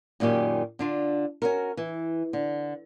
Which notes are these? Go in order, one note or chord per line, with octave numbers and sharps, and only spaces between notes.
F#2 A#2 D#3 C#4 G4
D3 D4 F4
C#4 F#4 A#4
E3
D3